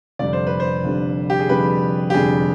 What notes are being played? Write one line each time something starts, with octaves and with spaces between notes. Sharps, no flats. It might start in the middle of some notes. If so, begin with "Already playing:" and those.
F1 F2 D3 G3 D4 D5
C5
B4
C5
F1 F2 D3 G3 D4
G4
G#4
F1 F2 D3 G3 D4 B4
G4
F1 F2 D3 G3 D4 G#4